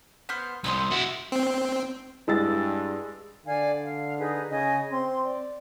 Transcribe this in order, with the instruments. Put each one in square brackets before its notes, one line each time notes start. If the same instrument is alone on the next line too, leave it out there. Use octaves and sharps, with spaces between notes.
[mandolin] B3 C5 F6
[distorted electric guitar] C2 [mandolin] C5 D#5 E6
[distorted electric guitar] E4 F#4
[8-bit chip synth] C4
[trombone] G2 [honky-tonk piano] G#3 E6 A6 [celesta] E4
[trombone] D3 [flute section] D5 F5 G#5
[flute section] F5
D#4 G#4 B4
[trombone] C#3 [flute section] D#5 G#5
[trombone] C4 [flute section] C6
[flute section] D5